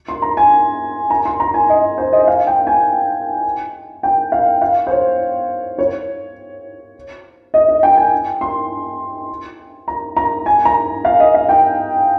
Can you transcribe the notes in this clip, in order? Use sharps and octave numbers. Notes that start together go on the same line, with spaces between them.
C6
A#5
G#5
A#5
C6
A#5
G#5
D#5
C5
D#5
F5
G5
G#5
G5
F5
F5
C5
C#5
C#5
D#5
D#5
G5
G#5
C6
A#5
A#5
G#5
A#5
F5
D#5
F5
G5